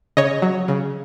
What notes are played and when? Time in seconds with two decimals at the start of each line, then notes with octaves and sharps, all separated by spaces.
0.17 C#3 C#5 D#5
0.42 F#3
0.68 C#3